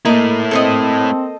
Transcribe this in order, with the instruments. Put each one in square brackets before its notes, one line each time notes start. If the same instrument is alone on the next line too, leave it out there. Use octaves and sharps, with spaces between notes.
[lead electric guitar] A3 E4 [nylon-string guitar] A#3 [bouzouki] D#4
[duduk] C4 [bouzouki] A4 C5 D#5